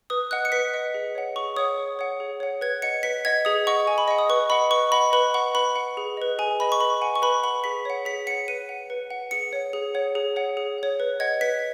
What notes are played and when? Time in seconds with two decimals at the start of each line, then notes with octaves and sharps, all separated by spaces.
0.10 B4 D#6
0.31 D#5 F#5 F#6
0.45 C#7
0.52 B4 B6
0.74 D#5 F#5
0.94 G#4
1.15 C#5 F#5
1.36 G#4 C#6
1.56 C#5 F#5 D#6
1.79 G#4
1.99 C#5 F#5
2.20 G#4
2.40 C#5 F#5
2.61 B4 G#6
2.82 D#5 F#5 C#7
3.03 B4 B6
3.25 D#5 F#5 G#6
3.45 G#4 D#6
3.67 D#5 F#5 C#6
3.87 G#4 G#5
3.98 B5
4.08 D#5 F#5
4.19 D#6
4.29 B4 C#6
4.50 D#5 F#5 B5
4.71 B4 C#6
4.92 D#5 F#5 B5
5.13 B4 B5
5.34 F#5 C#6
5.55 B4 B5
5.76 F#5
5.97 G#4
6.17 B4 D#5
6.39 G#4 G#5
6.60 B4 D#5 B5
6.72 C#6
6.81 B4 B5
7.01 F#5 G#5
7.16 C#6
7.22 B4 B5
7.43 F#5 B5
7.64 G#4 B6
7.85 C#5 F#5
8.05 G#4 B6
8.27 F#5 C#7
8.30 C#5
8.48 B4 D#7
8.69 F#5
8.90 B4
9.10 F#5
9.31 G#4 C#7
9.53 C#5 F#5
9.73 G#4
9.94 C#5 F#5
10.15 G#4
10.36 C#5 F#5
10.57 G#4
10.78 C#5 F#5
11.00 B4
11.20 D#5 F#5 G#6
11.41 B4 B6